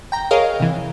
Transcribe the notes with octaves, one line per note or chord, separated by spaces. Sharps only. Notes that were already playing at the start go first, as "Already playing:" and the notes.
G5 A#5
G#4 A#4 C#5 D#5 F5
C3 E3